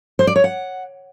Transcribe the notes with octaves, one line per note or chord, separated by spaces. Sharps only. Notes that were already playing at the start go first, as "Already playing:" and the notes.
C5
D5
C#5
F#5